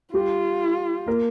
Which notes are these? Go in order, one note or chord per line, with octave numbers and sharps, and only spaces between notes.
G3 F4 G4
A#3 A#4